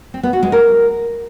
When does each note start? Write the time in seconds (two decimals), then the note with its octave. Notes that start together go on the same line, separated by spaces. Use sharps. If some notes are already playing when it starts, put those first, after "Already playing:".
0.14 C4
0.23 B3
0.33 F#4
0.43 G#3
0.52 A#4